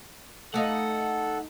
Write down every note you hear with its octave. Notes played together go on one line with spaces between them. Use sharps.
A3 D#4 A4 F5 F#5